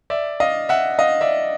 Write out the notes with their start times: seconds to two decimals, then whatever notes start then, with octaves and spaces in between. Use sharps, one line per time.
0.10 D5 E5
0.40 D#5 F5
0.69 E5 F#5
0.99 D#5 F5
1.21 D5 E5